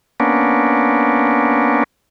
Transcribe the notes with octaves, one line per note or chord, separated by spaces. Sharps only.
A#3 B3 C#4 D4